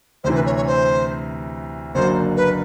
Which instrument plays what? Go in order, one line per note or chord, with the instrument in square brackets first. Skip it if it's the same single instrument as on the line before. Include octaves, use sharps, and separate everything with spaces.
[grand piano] D2 C3 E3 [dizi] C5
[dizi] B4
C#5
C#5
C5
[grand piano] F#1 F#2 D3 F#3 A#3 [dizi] C5
[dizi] B4